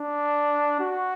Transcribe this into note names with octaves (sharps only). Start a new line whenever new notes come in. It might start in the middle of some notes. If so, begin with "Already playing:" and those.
Already playing: D4
F#4